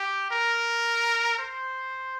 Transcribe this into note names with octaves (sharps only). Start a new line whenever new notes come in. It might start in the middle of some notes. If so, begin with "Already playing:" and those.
Already playing: G4
A#4
C5